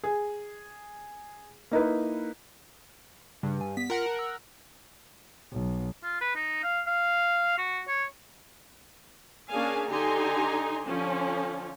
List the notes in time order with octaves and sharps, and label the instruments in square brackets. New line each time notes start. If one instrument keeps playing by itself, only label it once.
[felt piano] G#4
A#3 D#4 E4 B4
[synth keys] G2 [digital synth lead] C#3
[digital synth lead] G#5
[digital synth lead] B3 [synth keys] B6
[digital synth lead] F4 [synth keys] A#4 F#5
[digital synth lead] A5
E6
[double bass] B1
[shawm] F4
B4
D#4
F5
F5
F#4
C#5
[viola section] A#3 C#4 D4 G#4 F5 G#5
D3 D#4 G4 G#5 A#5 C6
D3 F3 C#4